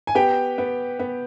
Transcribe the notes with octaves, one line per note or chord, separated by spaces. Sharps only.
G#5
B3 G4 G5
B3
B3